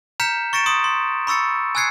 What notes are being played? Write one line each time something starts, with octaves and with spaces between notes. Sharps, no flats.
A#5 F6 G6 B6 C#7 E7
C#6 A6 A#6 C#7 D7 E7
C6 D#6 D7 E7
C6
B5 C#6 E6 A6 C#7
G#5 E6 F#6 G#6 C7 C#7